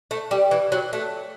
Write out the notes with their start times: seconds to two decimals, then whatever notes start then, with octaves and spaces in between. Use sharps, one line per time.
0.11 A3
0.31 G3
0.51 E3
0.72 F#3
0.93 A3